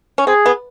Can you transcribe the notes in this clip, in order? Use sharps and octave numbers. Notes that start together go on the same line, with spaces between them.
C#4
C4 G#4
B3